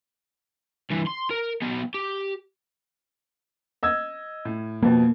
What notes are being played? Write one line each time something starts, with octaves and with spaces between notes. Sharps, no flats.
G2 E3
C6
A#4
B3 D#4
G4
D#5 E6 G#6
A2
F2 B2 A#3